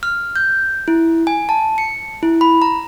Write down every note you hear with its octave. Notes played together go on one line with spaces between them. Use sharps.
F6
G6
E4
G#5
A5
C#7
E4
B5
A#5